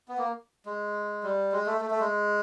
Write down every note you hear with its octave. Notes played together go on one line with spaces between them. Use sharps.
B3
A#3
G#3
G3
G#3
A3
A3
A3
G#3